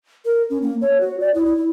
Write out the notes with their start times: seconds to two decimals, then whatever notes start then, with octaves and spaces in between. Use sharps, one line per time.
0.25 A#4
0.50 C#4
0.62 A#3
0.81 C#5
1.01 F#4
1.20 D5
1.35 E4
1.46 E4
1.58 E4